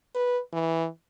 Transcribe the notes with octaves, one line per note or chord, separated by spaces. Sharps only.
B4
E3